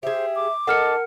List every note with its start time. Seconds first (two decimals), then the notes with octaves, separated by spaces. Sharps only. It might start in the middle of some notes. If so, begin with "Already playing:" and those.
0.03 G4 G#4 C5 E5
0.36 D6
0.67 D#4 A4 A#4 F#5 A5 F6 C#7